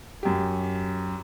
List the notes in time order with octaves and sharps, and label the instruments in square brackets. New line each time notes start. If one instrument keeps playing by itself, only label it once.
[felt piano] F#2 G4